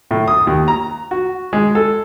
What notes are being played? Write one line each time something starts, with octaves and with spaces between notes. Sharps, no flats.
A2
D#6
D#2
A#5
F#4
G#3
A4